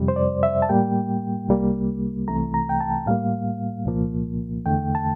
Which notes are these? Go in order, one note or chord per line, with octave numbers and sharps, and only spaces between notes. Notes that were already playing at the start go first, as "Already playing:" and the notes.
Already playing: F2 C3 G3
C5
D5
E5
A5
A2 G3 A#3 G5
C2 C3 G3 A#3
C2 C3 E3 A3 A#5
A#5
G5
A5
A2 G3 A#3 F5
C2 A#2 F3 A#3
E2 D3 A3 G5
A5